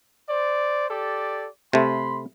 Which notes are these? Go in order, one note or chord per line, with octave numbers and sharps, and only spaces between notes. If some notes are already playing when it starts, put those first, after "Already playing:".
C5 D5
G4 A4 D5
C3 A3 B5 C6